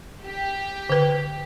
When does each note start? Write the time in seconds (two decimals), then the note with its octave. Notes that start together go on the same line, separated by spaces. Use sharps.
0.24 G4
0.89 D3 B4